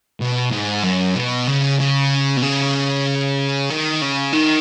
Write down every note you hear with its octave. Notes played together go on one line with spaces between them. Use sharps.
B2
G#2
F#2
B2
C#3
C#3
B2
C#3
D#3
C#3
D#3